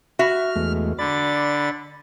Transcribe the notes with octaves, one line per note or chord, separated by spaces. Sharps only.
F#4 E5 F6
E2 G#3 A3
D3 D5 B5 A6